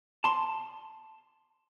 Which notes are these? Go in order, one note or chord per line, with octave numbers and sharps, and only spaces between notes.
A5 C6